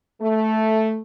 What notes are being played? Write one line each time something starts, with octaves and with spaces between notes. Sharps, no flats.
A3